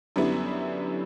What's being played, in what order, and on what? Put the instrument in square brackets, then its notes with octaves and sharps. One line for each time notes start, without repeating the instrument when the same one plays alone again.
[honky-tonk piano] F#2 D3 G3 B3 E4